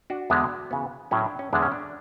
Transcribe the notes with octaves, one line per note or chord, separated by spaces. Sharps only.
D4 F#4
E2 D3 G#3 B3
C#3 E3 B3
A2 F#3 A3 C#4 E4
D4
C#4
E2 D3 G#3 D4
C#4
D4